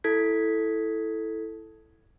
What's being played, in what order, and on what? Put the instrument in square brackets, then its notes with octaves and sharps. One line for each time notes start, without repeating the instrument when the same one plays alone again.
[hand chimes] E4 A4 G#6 B6